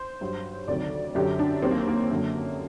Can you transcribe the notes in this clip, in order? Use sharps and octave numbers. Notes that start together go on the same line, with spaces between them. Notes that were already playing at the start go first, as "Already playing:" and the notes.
Already playing: C5
G2 F#3
D2 C3 D#3 F#3 D5
F#2 D3 F#3 G4
D4
D#2 D#3 F#3 C4
A#3
A#3
F#2 D3 F#3